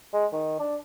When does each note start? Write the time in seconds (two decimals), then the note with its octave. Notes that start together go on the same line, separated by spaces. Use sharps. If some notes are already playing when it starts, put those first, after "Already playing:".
0.13 G#3
0.33 D#3
0.59 D4